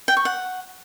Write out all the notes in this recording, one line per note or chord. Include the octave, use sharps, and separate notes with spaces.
G5
C#6
F#5